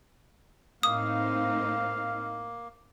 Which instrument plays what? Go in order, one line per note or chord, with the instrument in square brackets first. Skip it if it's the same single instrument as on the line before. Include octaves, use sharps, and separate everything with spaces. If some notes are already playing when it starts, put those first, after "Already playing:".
[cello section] A2 C4 D#4 [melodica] A#3 [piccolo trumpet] F5 [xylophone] D#6